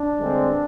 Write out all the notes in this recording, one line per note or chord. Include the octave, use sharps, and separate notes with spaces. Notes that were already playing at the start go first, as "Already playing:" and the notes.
Already playing: D4
G2 D3 G#3 C4